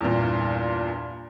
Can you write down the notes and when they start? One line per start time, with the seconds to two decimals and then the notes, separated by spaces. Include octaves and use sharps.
0.01 E2 G2 A#2